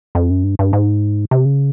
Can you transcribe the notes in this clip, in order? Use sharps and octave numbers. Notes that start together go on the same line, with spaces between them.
F2
F#2
G2
G2
G#2
C3
C#3